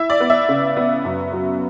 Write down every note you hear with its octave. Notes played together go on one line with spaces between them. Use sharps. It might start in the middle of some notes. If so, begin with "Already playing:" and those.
Already playing: E4 E5
D5
B3
E5
C#3
B3
F#2
F#3